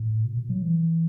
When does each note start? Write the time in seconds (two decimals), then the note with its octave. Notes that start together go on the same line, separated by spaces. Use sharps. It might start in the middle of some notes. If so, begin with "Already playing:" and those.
Already playing: A2
0.25 B2
0.37 B2
0.49 F#3
0.62 E3